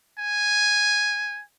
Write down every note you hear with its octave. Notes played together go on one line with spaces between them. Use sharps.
G#5